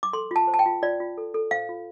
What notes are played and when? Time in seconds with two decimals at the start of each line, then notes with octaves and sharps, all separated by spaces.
0.03 D6
0.13 A4 C6
0.31 F4 A5
0.47 C5
0.54 A5
0.59 G5
0.66 F4
0.83 F4 D5
1.00 F4
1.18 A4
1.34 A4
1.51 C5 F5
1.69 F4